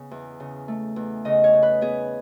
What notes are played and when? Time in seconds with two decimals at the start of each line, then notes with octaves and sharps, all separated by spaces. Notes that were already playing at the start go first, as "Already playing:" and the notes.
Already playing: C#3 B3 C#4
0.11 E2
0.40 C#3
0.68 A3
0.96 E2
1.25 C#3 D#5
1.44 C#5
1.53 C#3
1.63 B4
1.81 B3 G#4